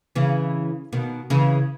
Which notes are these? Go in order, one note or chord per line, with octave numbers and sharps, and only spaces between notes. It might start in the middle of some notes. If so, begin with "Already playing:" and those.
C#3 E3
B2 D#3
C#3 E3